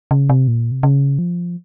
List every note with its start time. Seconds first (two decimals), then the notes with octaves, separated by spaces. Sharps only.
0.11 C#3
0.30 C3
0.48 A#2
0.71 C3
0.83 C#3
1.19 F3